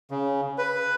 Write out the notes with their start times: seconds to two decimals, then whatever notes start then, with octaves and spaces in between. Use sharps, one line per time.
0.11 C#3
0.58 B4